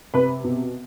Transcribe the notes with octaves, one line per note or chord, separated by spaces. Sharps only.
C3 B4 B5
B2